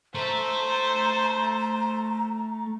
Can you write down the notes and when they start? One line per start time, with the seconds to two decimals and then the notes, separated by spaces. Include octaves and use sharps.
0.15 A3 C5 E5 A#5